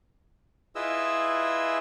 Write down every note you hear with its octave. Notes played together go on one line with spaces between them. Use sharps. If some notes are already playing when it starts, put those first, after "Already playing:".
E4 F4 G#4 B4 D#5 E6